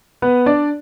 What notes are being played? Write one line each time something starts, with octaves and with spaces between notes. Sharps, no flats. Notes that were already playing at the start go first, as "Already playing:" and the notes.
B3 B4
D4 D5